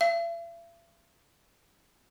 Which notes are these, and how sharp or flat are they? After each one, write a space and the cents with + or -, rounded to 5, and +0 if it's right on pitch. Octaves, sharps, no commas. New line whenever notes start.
E5 +45